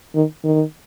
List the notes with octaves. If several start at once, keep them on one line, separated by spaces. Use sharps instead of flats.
D#3
D#3